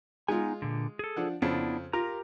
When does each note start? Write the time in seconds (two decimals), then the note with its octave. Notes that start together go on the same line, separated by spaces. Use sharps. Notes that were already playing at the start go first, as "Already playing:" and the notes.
0.28 G#3 B3 D#4 F4 G#5
0.62 A#2 D3
0.99 G#4 A4
1.16 F3 D4 F#5
1.42 F2 C#3 B3 D4 E4
1.93 F4 G4 A#4 A#5